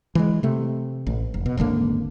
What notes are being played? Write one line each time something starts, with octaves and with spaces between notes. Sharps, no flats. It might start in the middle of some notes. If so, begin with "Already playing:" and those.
E3 F#3 G#3
C3 A3
A1
F1
B2
D#1 G#1 D3 A#3